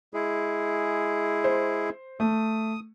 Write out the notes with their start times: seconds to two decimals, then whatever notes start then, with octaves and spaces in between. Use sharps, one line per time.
0.14 G#3 E4 G#4
1.44 C5
2.20 A3 D#6